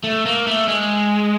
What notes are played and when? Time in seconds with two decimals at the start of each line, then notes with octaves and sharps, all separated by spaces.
0.04 A3
0.26 A#3
0.47 A3
0.68 G#3